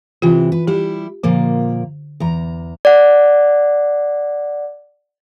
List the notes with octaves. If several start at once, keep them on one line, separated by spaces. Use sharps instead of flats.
C3 E3 F4
B4
G3 E4 G4
A#2 D3 F3 A#3
E2 A#5
D5 F#5